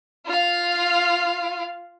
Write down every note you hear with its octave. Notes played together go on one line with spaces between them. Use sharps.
F4 F5